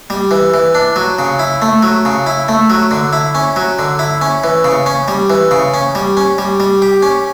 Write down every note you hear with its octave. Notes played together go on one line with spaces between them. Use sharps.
G3
E3
E3
D4
F#3
C#3
E4
A3
F#3
C#3
E4
A3
F#3
D3
E4
C#4
F#3
D3
E4
C#4
E3
C#3
C#4
G3
E3
C#3
C#4
G3
C#4
G3
G3
G4
C#4